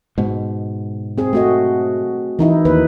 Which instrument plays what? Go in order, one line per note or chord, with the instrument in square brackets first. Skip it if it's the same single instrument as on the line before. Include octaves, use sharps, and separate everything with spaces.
[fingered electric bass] G#2 B2
[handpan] C4 G#4
A3 F#4 D#5
E3 D#4 E4
[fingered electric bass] D#2 [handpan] B4